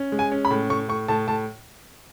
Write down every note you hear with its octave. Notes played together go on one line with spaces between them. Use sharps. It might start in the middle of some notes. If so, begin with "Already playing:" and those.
Already playing: C#4
G#3
G#5
C#4
B5
A2
A2 C#6
A2 C#6
A2 A5
A2 A5